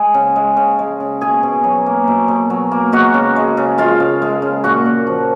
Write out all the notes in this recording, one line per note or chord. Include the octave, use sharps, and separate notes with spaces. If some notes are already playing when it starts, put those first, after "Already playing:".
Already playing: G#3 G#4 G#5
C#3
G#3
C#3
G#3
C#3
B2 G#4 G#5
B2
F#3
A#3
B2
B2
F#3
A#3
G#3 F#4 F#5
C#3
G#3
C#3
G#3 F4 F5
C#3
G#3
C#3
A#2 F#4 F#5
A#2
F3